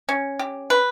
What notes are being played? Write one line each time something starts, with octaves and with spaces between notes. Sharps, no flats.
C#4
G4
B4